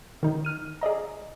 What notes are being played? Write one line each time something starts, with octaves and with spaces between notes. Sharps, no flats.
D#3 D#4
F6 D#7
G#4 D5 D#5 A#5